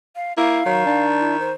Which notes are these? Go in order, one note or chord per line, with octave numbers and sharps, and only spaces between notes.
F5
A#3 E4 F5
D#3 F#3
D4
E4
C5